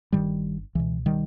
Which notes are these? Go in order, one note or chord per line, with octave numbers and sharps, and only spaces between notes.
G1 G2 D#3 G3
C#2 B2 E3
D#3 G3